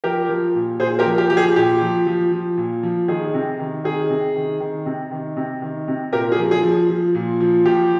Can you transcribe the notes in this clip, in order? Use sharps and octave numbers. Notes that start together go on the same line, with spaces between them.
F3 G4 A#4
F3
A#2
A#2 G#4 C5
G4 A#4
F3
G4
F3 G4
G#4
A#2 G4
F3
F3
F3
A#2
F3
D#3 G#4
C3
D#3
D#3 G#4
C3
D#3
D#3
C3
D#3
C3
D#3
C3
A#2 G4 A#4
G#4
F3
G#4
F3
F3
A#2
F3
F3 G4